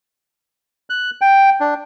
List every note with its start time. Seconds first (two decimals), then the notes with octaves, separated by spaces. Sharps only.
0.90 F#6
1.21 G5
1.60 D4